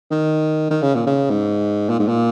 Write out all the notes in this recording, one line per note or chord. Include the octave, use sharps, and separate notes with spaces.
D#3
D#3
C#3
A#2
C#3
G#2
A#2
G#2
A#2